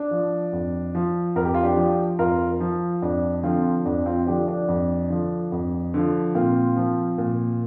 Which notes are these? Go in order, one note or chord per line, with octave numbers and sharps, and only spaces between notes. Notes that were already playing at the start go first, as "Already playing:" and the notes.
Already playing: D4
F3
F2
F3
F2 A#4
G4
F4
D4 G4
F3
F2 F4 A#4
F3
F2 D4
D3 F3 C4 F4
F2 D4
C4 F4
D3 F3 D4 G4
D4
F2
D3 F3
F2
D3 F3
A#2 C4 F4
F3
A#2